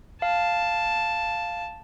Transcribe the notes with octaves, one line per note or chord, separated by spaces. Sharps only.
F5 A5